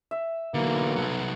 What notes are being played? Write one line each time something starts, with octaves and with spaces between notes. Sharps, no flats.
E5
B1 D3 E3 A#3
C2 F#3 F#4 A4